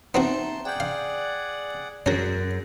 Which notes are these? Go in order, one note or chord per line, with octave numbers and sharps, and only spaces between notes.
B3 C4 D#4 F#4 E5 A5 A#5 C6
G#4 D5 F#5 G5 G6
F5
F#2 C#4 F#4 G#4 A#4